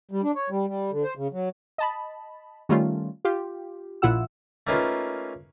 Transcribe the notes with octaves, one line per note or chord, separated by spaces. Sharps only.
G3
D4
C#5
G3
G3
D3
C5
C#3
F#3
D#5 A5 B5
D#3 G3 A3 C#4 F4
F4 G4
A#1 A#2 E4 F4 F#5 E6
A3 A#3 C#4 D#4 F4 B4